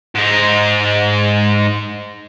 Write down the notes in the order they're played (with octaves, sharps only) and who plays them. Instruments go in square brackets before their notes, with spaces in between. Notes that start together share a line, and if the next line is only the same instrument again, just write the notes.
[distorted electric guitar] G#2 D#4